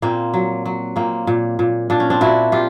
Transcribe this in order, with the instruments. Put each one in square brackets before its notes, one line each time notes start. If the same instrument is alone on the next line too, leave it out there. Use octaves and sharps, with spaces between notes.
[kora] A#2 A#3 C4
F#3
F#3
A#2 A#3 C4
A#2
A#2
A#2 D4
C#4
C4 D4
A#2 E4 F#4
A#2 F4 G4